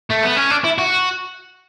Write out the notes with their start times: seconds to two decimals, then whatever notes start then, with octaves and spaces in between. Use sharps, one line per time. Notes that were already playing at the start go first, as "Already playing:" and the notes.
0.10 A3
0.23 B3
0.36 C#4
0.50 D4
0.64 E4
0.78 F#4